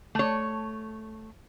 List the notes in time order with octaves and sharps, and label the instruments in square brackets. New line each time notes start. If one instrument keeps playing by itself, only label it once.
[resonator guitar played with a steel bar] A3 C#5